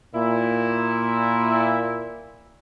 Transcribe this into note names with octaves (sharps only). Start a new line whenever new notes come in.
A#2 E4